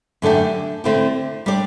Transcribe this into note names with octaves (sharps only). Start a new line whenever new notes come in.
F#2 D3 A3 D4 G4
D3 A3 C4 E4 G4
G3 D4 G4 D5